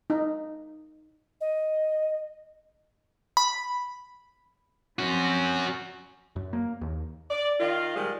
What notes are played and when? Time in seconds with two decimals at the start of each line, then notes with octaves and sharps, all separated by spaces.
0.10 D#4
1.41 D#5
3.37 B5
4.99 F3 C4 C#4 F#4
6.36 F#2
6.53 A#3
6.81 D#2
7.30 D5
7.60 D#3 F4
7.95 A#2 D#3 F3 G3 G#3